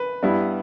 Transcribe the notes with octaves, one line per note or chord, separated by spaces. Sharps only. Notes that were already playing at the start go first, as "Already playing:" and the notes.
Already playing: B4
G2 G3 B3 E4